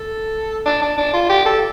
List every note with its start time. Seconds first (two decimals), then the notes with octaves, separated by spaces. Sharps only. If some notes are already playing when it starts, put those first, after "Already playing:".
Already playing: A4
0.66 D4
0.82 D4
0.98 D4
1.14 F4
1.30 G4
1.46 A4